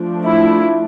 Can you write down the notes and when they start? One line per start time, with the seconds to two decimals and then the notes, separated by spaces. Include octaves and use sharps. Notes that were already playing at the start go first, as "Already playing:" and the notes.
Already playing: F3 A3 D4
0.24 E4